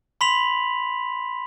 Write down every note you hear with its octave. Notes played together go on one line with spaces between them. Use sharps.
B5 C6 B6 F7 F#7